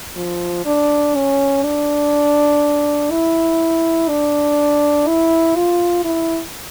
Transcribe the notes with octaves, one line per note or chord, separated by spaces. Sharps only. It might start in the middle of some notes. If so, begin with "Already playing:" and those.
F3
D4
C#4
D4
E4
D4
E4
F4
E4